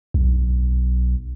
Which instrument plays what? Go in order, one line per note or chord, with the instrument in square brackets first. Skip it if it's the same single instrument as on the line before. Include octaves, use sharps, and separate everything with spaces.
[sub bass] B1